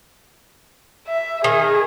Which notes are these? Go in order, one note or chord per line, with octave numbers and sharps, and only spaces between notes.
E5
D#3 G#4